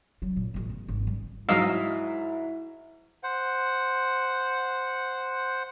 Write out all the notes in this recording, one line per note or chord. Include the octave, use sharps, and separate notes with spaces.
F#3 G3
A#2
A1 F2
B3
G#1 G#2
G3
G#2 F#3 E4 D#5 F5 E6 F6
C5 F#5